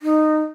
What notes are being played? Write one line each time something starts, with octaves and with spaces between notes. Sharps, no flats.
D#4